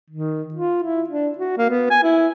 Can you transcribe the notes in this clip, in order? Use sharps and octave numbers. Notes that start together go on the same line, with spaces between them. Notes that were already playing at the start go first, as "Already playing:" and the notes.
D#3
F4
E4
D4
F#4
A#3
B3
G#5
E4